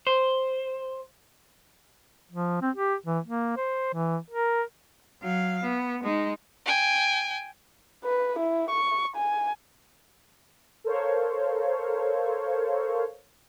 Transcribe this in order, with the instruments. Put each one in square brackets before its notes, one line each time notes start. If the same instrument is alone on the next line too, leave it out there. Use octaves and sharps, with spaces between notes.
[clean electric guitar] C5
[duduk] F3
C4
G4
E3
A#3
C5
E3
A#4
[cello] F#3 F5
B3
G#3 D#4
[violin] G5 G#5
[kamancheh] B4
E4
C#6
G#5
[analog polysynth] A4 A#4 C5 C#5 F5